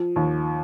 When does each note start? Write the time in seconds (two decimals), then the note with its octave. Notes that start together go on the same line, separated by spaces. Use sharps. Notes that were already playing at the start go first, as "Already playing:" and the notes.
Already playing: F3
0.16 D#2